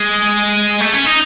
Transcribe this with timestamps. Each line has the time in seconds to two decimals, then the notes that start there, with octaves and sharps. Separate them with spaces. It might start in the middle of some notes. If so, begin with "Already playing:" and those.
Already playing: G#3
0.81 A3
0.94 C#4
1.06 D#4